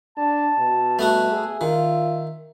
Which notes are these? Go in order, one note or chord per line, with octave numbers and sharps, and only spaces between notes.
D4 A5
B2
G3 A3 B3 F#4
G#4 E5
D#3 F4